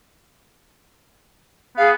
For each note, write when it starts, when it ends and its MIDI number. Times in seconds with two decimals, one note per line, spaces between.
1.77 1.95 59
1.77 1.91 68
1.77 1.89 77